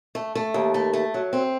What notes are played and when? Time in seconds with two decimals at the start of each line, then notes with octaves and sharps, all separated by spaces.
0.15 A3
0.35 A3
0.54 D#2
0.74 A3
0.93 A3
1.14 F#3
1.33 C4